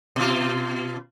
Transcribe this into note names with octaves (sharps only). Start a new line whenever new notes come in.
B2 F4